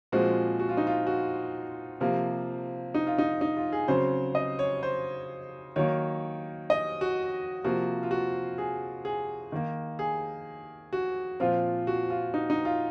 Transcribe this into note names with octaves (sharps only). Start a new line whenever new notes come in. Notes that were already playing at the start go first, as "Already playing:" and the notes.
A#2 F3 G#3 C4 F#4
F#4
F4
D#4
F4
F#4
C3 F3 A#3
D#4
F4
D#4
D#4
F4
G#4
C#3 F#3 C4 C5
D#5
C#5
C5
D#3 F#3 A#3 C#5
D#5
F#4
C3 F3 A#3 F#4
F4
F#4
G#4
G#4
D#3 A#3
G#4
F#4
A#2 F3 C4 F4
F#4
F4
D#4
D#4
F4